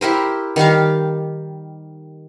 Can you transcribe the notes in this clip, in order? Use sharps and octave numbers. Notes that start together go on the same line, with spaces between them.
E4 G4 A#4 C5
D#3 G3 G4 F5